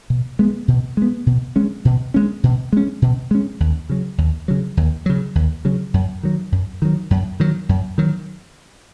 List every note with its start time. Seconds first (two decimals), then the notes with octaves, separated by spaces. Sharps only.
0.10 B2
0.39 G#3 B3
0.68 B2
0.97 G#3 B3
1.26 B2
1.56 G#3 C#4
1.85 B2
2.14 G#3 C#4
2.43 B2
2.73 G#3 C#4
3.02 B2
3.31 G#3 C#4
3.60 D#2
3.90 C#3 F#3
4.18 D#2
4.48 C#3 F#3
4.77 D#2
5.06 C#3 F#3
5.35 D#2
5.65 C#3 F#3
5.94 F#2
6.23 D#3 F#3
6.52 F#2
6.82 D#3 F#3
7.11 F#2
7.40 D#3 F#3
7.69 F#2
7.98 D#3 F#3